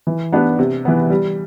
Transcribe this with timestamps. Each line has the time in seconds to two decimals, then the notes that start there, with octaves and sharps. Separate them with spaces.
0.07 E3
0.33 B3 D4 G4 B4
0.59 C3
0.85 E3 B3
1.10 G3